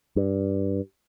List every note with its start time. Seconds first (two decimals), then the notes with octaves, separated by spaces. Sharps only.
0.16 G2